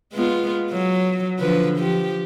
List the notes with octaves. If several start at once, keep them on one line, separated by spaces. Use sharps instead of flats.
G#3 B3 F4
F#3
D3 F3 B4
F3 G4